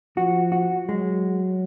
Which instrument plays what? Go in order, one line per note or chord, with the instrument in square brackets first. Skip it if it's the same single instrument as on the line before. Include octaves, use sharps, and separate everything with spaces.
[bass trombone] F3 [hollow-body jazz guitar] F#4
[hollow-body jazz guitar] F#4
[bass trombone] F#3 [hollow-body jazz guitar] G#3